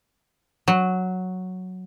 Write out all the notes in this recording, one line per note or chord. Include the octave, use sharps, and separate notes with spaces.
F#3